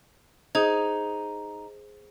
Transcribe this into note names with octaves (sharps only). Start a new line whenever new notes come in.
D#4 G#4 C5 G#6